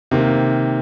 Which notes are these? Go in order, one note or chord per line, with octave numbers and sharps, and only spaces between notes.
C3 D#3 A#3